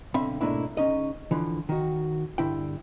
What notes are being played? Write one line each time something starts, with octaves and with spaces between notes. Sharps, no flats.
B1 D3 C4 E5 F5 B5
G#2 B2 A3 A#3 D4 E4
C#2 C#4 D#4 D#5
D3 E3 F3
D#3 F#4
G2 D3 E4 G5